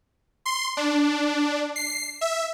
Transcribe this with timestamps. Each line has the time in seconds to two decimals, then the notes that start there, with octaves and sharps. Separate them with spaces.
0.46 C6
0.77 D4
1.76 C7
2.21 E5